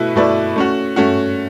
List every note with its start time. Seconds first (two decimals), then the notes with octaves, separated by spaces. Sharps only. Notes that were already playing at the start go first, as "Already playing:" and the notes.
Already playing: B2 A3 E4 B4
0.16 B2 A3 E4 B4 D5
0.56 A3 C#4 F#4
0.96 A3 C#4 F#4